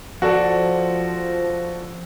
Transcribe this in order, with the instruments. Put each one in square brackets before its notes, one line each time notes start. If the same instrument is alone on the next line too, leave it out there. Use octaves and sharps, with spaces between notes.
[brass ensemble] F3 [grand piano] F#4 A4 D5